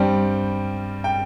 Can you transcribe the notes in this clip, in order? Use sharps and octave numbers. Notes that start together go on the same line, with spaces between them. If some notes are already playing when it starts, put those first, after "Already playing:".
Already playing: G2 G3 C4 G5
G5